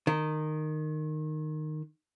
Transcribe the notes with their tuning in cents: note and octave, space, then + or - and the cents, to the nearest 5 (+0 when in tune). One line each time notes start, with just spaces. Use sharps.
D#3 -15